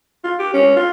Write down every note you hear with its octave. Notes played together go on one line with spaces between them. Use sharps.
F4
G4
C#4
F4